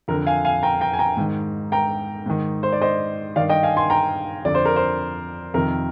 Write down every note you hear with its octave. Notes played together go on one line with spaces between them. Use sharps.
F2 D3 A#4
F5 G#5
F5 G#5
G5 A#5
G5 A#5
G#5
G5 A#5
G#2 D#3
G5 A#5
G#2 D#3
C5
D5
C5 D#5
G2 D#3 D5 F5
D#5 G5
F5 G#5
G#5 C6
G5 A#5
F2 D3 D5
C5
A#4
C5
F2 C3 D#3 A#4